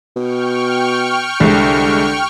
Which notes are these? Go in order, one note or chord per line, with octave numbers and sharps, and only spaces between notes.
B2 G5 C#6 F6
C2 D3 G#3